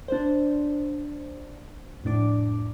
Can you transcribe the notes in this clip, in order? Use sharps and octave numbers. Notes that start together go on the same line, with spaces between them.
D4 C5
F2 A2 D4 D6